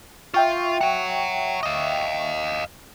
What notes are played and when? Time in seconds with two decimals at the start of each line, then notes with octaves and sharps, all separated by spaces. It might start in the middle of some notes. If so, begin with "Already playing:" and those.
0.34 F4 E5 G5 C#6
0.81 C#5 F#5
1.63 D#5 F5